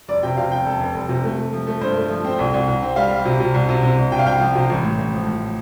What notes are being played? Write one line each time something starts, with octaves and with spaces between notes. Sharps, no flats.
F1 D5
C3 G5
C3 F5
F1 G5
F1 A4
F1
F1
C3
A3
A3
F3
A3
G2 C5
A3
F3
C4
C2
C2
C2
C4
G3 F5
G3
C3
C3
C2
C3
C3
C2
C2 G5
F5
C2 G5
F3
C3
A1
A2
A1
F3
A2